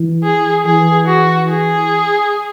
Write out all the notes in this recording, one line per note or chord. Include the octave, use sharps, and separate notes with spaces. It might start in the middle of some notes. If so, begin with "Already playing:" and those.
Already playing: E3
G#4
E3 G#4
F#4
G#4